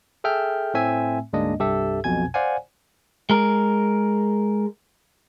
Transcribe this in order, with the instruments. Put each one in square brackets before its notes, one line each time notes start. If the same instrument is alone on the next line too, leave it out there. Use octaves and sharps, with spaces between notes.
[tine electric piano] G#4 A4 E5 G5 F6 G6
A2 A3 C4 E5 G#5
D2 G#2 G#3 A#3 D4 D#5
C2 G2 G4 A4 E5
B1 F2 B2 G#5 G#6
C5 D5 F5 F#5 G#5
[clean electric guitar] G#3 A#4